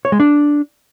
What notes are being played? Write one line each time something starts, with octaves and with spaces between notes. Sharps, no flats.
C#5
G#3
D4